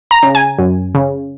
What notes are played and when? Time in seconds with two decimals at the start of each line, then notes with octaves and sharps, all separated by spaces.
0.11 A#5
0.23 C#3
0.35 G#5
0.59 F#2
0.95 C#3